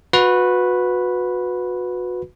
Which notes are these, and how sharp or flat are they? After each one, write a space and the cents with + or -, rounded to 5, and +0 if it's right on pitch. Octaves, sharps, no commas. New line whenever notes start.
F#4 -30 B4 +0 B5 +0